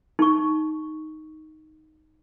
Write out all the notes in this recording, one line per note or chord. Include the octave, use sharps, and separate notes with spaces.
D#4 C#6